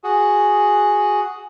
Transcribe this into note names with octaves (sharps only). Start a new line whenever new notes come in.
F#4 G#4